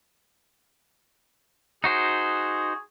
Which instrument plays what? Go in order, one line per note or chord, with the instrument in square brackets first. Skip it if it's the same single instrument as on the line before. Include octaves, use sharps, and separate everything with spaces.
[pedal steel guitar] D#4 F#4 C5 [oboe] G#4